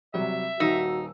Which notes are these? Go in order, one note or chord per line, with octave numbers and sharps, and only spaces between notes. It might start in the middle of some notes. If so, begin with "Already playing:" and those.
C3 F#3 G3 E5
D#1 D#4 F#4 E6